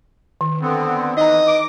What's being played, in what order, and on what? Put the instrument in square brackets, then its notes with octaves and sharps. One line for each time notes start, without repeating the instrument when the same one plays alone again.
[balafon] D#3
[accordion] D3 B3 C4
[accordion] E3 [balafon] D#4 A#5 [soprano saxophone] D#5
[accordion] D6